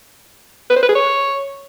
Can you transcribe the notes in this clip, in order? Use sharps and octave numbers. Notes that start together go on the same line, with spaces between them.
B4
C5
B4
G#4
C#5